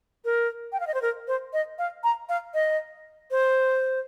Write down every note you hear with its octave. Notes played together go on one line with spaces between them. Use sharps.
A#4
G5
F5
D#5
C5
A#4
C5
D#5
F5
A#5
F5
D#5
C5